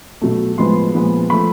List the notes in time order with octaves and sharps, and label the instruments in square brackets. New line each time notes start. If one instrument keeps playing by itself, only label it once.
[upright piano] B2 F#3 A3
A2 F3 G#3 B3 C6
A#2 F3 G#3 B3
F3 A3 B5